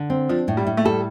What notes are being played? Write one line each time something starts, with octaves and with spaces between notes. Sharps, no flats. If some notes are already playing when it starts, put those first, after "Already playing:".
Already playing: D3
C4
F3 D4
A2
G3
A2
A3
G3 A4